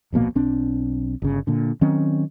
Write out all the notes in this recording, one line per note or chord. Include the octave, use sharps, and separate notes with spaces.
D1 A#1 B2 A#3
B1 C4 D4
G1 C#3
A#2 D3
D#3 F#3 C4 C#4